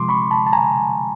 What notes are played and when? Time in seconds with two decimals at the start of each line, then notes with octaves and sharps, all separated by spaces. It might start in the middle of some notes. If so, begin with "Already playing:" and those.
Already playing: C3 F3 G#3 C6 D6
0.09 B5 C#6
0.31 A5 B5
0.46 A5
0.53 G#5 A#5